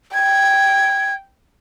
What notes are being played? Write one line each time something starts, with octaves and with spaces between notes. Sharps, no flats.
G5 G#6